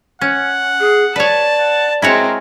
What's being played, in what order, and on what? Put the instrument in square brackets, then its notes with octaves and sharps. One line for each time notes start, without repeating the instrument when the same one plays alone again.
[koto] C#4 [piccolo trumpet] F#5
[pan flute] G#4
[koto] B4 C#5 [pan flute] D5 [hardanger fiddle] A5
[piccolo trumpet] F#5
[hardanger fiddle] G#3 C4 [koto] E4 F#4 C#5 [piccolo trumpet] A#4